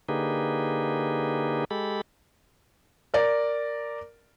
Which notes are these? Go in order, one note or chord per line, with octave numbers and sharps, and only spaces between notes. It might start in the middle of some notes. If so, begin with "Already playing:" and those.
D3 A#3 D#4 G4 G#4 B4
G#3 G4 A4 B5
A#4 D5